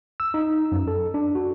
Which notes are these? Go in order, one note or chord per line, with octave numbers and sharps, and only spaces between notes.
E6
D#4
F#2
A4
D4
F#4